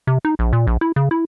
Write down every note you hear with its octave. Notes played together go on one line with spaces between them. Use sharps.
C3
D#4
A#1
A#2
A#1
E4
C#3
E4